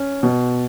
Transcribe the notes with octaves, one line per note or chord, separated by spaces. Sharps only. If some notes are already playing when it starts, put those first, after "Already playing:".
Already playing: C#4
B2